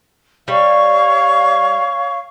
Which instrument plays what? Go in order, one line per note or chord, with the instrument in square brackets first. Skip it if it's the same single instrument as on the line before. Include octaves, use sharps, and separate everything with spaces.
[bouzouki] G3 [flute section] C#5 F5 C#6